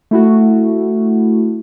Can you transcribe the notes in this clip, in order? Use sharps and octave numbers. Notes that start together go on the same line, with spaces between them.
A3 E4 F#4